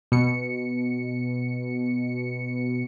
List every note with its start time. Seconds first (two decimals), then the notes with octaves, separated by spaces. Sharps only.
0.12 B2 C#7